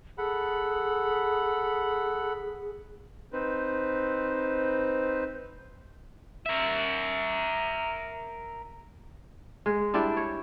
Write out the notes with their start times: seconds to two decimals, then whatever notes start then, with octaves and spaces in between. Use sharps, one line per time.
0.18 G#4 A4 F#5 B5
3.33 C4 D#4 B4 C5
6.46 A#4 E5
9.66 G#3
9.94 G3 D4 E4 D5
10.17 C#5